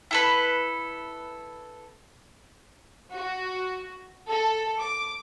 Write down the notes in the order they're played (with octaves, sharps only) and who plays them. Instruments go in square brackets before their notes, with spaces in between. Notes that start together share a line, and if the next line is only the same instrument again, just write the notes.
[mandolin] E4 A4 B4
[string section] F#4
A4
D6